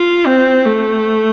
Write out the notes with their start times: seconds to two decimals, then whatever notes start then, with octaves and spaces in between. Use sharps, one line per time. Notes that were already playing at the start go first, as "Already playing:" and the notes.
Already playing: F4
0.26 C4
0.66 A3